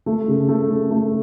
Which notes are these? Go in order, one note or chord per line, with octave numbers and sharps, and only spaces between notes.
A3
C#3
A3
C#3
A3